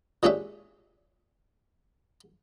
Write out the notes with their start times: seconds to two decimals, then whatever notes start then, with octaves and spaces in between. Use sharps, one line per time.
0.23 A#2 G#3 C#4 D4 G4 E5